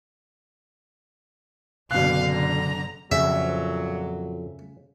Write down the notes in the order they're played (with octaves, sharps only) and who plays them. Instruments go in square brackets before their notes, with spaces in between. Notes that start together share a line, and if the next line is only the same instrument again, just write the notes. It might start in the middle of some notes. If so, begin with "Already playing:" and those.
[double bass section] F#1 D3 [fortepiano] B2 F#6 [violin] F5
[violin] A#5
[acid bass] F2 [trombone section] A#2 F#3 [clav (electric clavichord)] C#3 [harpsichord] E5